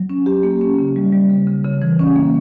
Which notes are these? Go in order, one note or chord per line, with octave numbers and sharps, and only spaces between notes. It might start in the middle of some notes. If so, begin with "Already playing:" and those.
Already playing: F#3
C#4
G4
A#3
C#4
C#3
G3
G3
C#3
C#3
C#3
E3
C#4
A#3